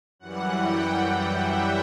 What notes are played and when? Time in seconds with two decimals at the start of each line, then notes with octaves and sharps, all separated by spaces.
0.19 F#2 E3 G3 F#5
0.58 G5
0.97 F#5
1.34 E5